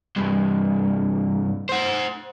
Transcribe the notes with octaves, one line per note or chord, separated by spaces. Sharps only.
C2 G2
C5 F#5